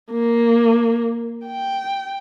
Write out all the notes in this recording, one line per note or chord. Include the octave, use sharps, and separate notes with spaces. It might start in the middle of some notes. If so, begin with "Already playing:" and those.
A#3
G5